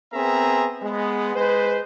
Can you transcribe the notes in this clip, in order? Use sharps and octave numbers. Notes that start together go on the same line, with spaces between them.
B3 C4 G#4 A#4 E5 A#5
G#3 B3
G#3 B4 C5